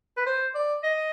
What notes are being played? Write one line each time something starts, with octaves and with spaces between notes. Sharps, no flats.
B4
C5
D5
D#5